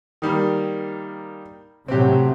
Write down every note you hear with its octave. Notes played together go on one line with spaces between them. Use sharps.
D#3 G3 A#3
A2 C3 F#3 C4 G4